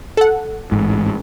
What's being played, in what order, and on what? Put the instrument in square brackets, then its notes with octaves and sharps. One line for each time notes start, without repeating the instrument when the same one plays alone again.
[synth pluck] A4 F#5
[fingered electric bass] A1 G#2